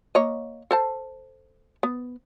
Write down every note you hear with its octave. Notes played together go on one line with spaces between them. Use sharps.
A#3 C#5 D#5
A4 C5 A5
B3